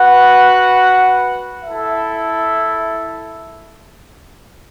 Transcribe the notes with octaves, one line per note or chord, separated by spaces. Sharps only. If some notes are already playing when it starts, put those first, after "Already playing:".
Already playing: F#4 B4 F#5
E4 A4 E5